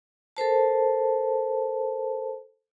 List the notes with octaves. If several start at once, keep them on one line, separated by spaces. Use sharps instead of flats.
A4 A#4 C5 A5